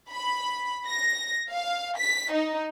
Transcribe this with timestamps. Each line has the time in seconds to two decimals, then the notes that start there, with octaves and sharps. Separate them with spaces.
0.11 B5
0.85 A#6
1.50 F5
1.97 B6
2.31 D#4